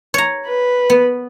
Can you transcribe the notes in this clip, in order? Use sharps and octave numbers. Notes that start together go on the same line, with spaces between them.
C#5 A#5
B4
B3